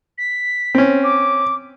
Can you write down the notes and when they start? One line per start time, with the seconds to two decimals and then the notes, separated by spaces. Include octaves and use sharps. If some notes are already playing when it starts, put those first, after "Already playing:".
0.18 B6
0.75 C4 C#4
1.03 D6